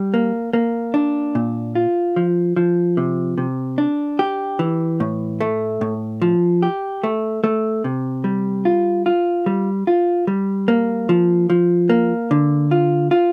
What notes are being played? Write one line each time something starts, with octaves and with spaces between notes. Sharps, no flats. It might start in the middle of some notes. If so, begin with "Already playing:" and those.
Already playing: G3
A#3
A#3
D4
A#2
F4
F3
F3
C3
C3
D4
G4
E3
A2
A3
A2
F3
G4
A3
A3
C3
G3
F4
F4
G3
F4
G3
A#3
F3
F3
A#3
D3
F4
F4